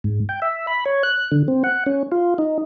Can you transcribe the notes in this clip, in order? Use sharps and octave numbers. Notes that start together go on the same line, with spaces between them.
G#2
G5
E5
B5
C#5
F#6
D3
C4
F#5
C#4
F4
D#4